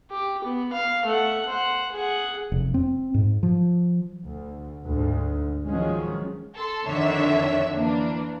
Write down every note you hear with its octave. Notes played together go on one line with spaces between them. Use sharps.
G4
B3
F5
A3 F#5
C5 F#5
G#4 F#5
F1
C4
G#2
F3
D2
D2 G#2
D#3 F3 F#3 G#3 C#4
A4 C6
F2 D3 D#3 D4 C#5 E5
E3 A#3 D4